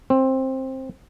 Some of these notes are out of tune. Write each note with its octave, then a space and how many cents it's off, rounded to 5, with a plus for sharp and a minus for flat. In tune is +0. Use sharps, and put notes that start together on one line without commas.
C4 +15